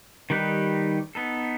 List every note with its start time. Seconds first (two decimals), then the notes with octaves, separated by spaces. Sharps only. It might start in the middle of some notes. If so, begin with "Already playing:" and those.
0.30 D#3 G3 D#4 G4 B4
1.15 B3 D#4 A4